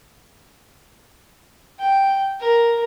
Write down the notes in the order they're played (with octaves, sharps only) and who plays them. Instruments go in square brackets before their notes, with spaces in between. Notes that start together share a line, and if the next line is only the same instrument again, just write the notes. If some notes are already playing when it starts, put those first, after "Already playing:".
[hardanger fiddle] G5
A#4